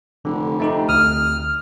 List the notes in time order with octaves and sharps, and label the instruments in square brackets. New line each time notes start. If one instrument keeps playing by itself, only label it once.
[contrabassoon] F1 [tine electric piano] D3
[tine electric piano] A3 D#4 G4
[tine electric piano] D2 D#6 [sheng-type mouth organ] F6